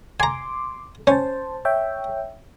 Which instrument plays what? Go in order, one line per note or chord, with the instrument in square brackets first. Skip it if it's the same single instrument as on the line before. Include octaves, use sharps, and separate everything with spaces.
[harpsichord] G#5 A#5 [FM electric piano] C6 D6
[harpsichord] C#4 [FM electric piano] C5 A5
[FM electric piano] C#5 E5 G5